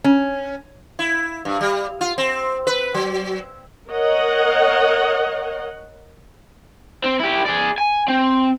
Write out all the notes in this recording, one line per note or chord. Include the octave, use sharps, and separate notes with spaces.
C#4
E4
G2
G3
F4
C4
B4
F#3
A#4 C#5 D#5 F#5
C4
E4 G4
G#4 D5
G#5
C4